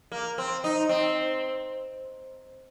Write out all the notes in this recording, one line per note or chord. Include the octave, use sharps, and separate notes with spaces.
A#3
C4
D#4
C4